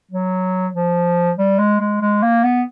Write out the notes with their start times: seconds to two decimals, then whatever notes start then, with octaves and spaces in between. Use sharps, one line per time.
0.11 F#3
0.74 F3
1.38 G3
1.59 G#3
1.80 G#3
2.01 G#3
2.22 A#3
2.44 B3